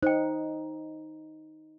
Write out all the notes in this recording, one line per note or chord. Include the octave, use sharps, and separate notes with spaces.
D#4 C5 G5